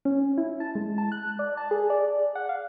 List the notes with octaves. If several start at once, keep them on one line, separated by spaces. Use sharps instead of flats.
C#4
E4
A5
G#3
A5
F#6
D5
A5
G#4
D5
F#5
F5